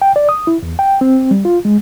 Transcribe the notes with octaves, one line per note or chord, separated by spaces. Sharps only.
G5
D5
D#6
E4
E2
G5
C4
G3
F4
G#3